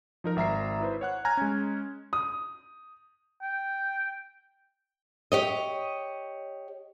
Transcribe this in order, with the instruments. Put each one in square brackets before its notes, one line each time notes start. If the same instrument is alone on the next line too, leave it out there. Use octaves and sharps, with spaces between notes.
[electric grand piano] F3 D#4 A#4
G#1 E5 A#5 C7
E4 B4 C5
C#5 F#5 F#6
G#5 A#5 F6 F#6 G#6
G#3 C#4
[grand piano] D#6
[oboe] G5
[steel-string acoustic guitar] G4 C#5 D#5